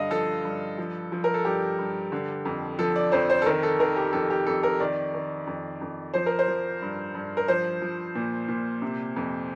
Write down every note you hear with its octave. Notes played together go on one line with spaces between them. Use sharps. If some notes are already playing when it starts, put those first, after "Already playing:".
Already playing: G2 D3 D#5 F5
F3 A4
G2
F3
F3
A#4
A4
G2 G4
G2
D3
F2
F3 A4
D5
F2 C5
C5
A4
D#3 A#4
A4
D#3 A#4
G4
F2 A4
G4
F2 A4
A#4
D#3 D5
D#3
F2
F2
F3 C5
A#4
C5
F3
G2
G2
A#4
F3 C5
F3
A#2
A#2
C3
F2